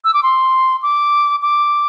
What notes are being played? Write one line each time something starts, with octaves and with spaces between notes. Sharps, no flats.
E6
D6
C6
D6
D6